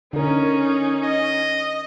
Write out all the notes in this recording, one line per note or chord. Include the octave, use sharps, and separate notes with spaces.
D3 C#4 D#4 A#4
D#5